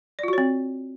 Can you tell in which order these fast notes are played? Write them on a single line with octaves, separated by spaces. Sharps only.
D5 F4 F#4 C#5 C4